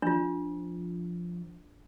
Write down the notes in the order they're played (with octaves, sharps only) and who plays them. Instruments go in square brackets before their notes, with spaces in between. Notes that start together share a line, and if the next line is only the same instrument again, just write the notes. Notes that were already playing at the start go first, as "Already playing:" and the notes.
[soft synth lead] F3 [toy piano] D4 F4